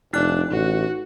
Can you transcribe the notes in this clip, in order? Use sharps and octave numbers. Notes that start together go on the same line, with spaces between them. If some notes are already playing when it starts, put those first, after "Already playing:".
F1 D4 D#4 F#6
A1 F#4